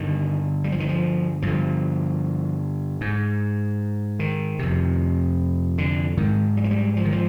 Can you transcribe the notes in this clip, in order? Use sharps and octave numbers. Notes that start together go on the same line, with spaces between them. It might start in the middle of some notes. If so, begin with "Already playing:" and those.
Already playing: G2 D3 D#3
G3
F3
D#3
F3
G2 D3 F3
G#2
D#3
F2 C3
D3
G#2 D#3
G3
F3
G3
F3
D#3
F3